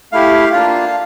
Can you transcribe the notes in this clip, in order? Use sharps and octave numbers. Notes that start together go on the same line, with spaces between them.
A3 E4 G4 F5
A#3 D4 F4 F5